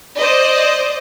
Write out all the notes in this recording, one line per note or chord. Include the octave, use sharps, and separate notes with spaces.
C5 D5 D#5